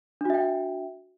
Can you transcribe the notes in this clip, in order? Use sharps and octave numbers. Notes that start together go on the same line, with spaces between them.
D4 F#4 E5 G5